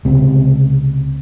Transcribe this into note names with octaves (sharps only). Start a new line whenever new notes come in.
C#2 C3